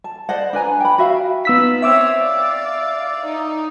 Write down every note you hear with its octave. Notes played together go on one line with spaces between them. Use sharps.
A5
C5 D5 D#5 F#5
D4 B4 G#5 A#5
G5 B5
F#4 E5 F5
B3 D#4 F4 E6 B6
C4 C#5 E5 D6 E6
D5 F5
D#4